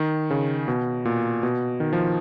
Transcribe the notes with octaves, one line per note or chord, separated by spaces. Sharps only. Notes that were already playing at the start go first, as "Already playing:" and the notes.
Already playing: D#3
C#3
B2
A#2
B2
D#3
F3